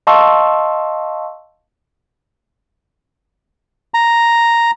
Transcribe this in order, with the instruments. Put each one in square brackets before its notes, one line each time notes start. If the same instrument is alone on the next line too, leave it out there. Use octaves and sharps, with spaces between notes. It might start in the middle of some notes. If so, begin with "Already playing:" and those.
[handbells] D#5 F5 A5 C6 C#6 E6
[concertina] A#5